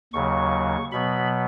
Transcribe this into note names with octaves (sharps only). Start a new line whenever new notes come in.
D#2 C#3 F#3 C#6
B2 F#3 B3 B5